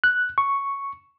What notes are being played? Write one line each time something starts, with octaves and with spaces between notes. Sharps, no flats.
F#6
C#6